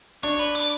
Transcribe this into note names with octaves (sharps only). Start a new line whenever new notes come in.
D4 C#5
B4
D5